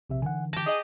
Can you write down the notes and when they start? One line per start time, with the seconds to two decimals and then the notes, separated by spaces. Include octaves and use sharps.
0.10 A#1 C3 E5
0.22 D3 E3 F#5 G#5
0.53 G4 A5 A#6
0.67 G#4 D#5